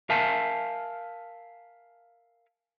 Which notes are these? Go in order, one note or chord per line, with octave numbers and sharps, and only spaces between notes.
A#4 E5 F5 G#5 A5